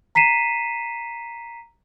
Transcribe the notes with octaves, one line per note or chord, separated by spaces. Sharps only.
A#5 B6 C7 D#7 E7